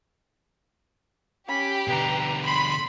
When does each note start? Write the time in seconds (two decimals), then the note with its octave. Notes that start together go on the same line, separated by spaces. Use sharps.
1.48 C#4 G4 B5
1.88 B2 D3 B4 A#5
2.44 B5 C6